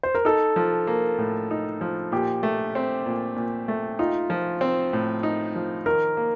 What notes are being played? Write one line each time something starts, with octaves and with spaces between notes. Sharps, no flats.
C5
A#4
D#4 A4
F3
A#3
A2
D#4
F3
A#2 G4
A3
C4
A#2
A#2
A3
D#4 F4
F3
C4
A2
D#4
F3
D#3 A#4
A#3